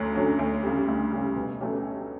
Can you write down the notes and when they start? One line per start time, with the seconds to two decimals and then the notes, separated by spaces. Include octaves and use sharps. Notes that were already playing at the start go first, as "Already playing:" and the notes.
Already playing: D2 D3 F#3 C#4
0.16 D3 F#3 C#4
0.39 D2
0.63 C#3 G3
0.88 D2
1.11 C#3 G3
1.36 B2
1.60 F#3 A3 C#4 G4